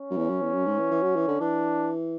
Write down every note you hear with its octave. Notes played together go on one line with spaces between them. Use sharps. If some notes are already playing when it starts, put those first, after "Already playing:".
Already playing: C#4
F#2
E2
F#2
E2
F#2
G#2
E3
E3
F#3
E3
D3
E3 D4